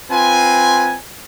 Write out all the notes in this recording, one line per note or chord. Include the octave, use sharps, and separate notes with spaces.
C4 F4 B4 G#5